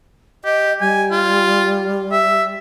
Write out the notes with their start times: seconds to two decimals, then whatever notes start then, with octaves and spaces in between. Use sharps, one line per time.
0.45 G4 D#5
0.81 G3 G#5
1.11 F4
2.12 E5